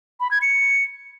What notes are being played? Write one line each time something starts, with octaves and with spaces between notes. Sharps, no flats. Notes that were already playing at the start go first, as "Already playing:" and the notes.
B5
G#6
C#7